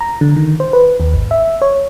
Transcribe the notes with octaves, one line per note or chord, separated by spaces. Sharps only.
A#5
D3
D#3
C5
B4
D#2
G#1
E5
C#5